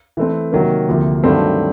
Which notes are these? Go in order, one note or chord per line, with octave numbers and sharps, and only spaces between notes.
E3 A3 C4
C3 D#3 F#3 A#3
D2 C3 F3 A#3
G2 D#3 F#3 A3 C4